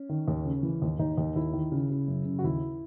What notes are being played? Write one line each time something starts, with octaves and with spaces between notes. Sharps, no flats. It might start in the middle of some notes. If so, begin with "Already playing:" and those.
Already playing: C#4
D#3
D#2
C#3
E3
D#2
D#2 D#4
D#2
D#2 E4
D#3
C#3
C#3
F#2
C#3
F#4
D#2 E4